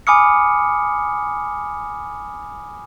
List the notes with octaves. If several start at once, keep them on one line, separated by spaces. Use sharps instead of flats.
G#5 B5 D6 D#6 F6 C#7